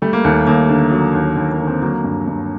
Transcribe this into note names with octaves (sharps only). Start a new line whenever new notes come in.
G3 A3
A#3
D#2 A3
D#2 A#3
D3
F#3
D#2
D#2
A#3
D3
C4
F#3 A#3
G2
G2